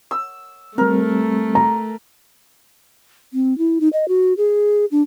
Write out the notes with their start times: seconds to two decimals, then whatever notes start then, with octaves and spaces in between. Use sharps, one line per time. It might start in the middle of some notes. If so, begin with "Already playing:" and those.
0.11 E6
0.78 G3 A3 C4 A#4
1.55 A#5
3.34 C4
3.58 E4
3.81 D#4
3.93 D#5
4.08 F#4
4.37 G#4
4.92 D4